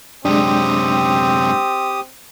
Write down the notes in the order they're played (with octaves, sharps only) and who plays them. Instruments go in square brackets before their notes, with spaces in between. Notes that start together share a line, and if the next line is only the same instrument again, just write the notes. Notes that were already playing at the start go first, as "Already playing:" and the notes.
[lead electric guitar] F#2 C3 [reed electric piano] G#3 D4 [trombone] C4 [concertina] G4 D#6